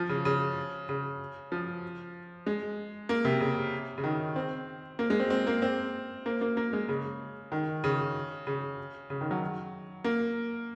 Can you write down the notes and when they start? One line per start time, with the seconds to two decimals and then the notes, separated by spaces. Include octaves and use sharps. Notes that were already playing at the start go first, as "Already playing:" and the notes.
Already playing: F3
0.09 C#3
0.25 C#3
0.89 C#3
1.52 F3
2.46 G#3
3.09 A#3
3.25 C3
3.40 C#3
3.98 C#3
4.04 D#3
4.36 C4
4.99 A#3
5.10 G#3
5.20 C4
5.30 C4
5.47 A#3
5.62 C4
6.26 A#3
6.41 A#3
6.57 A#3
6.73 G#3
6.89 C#3
7.52 D#3
7.84 C#3
8.47 C#3
9.10 C#3
9.21 D#3
9.31 F#3
10.04 A#3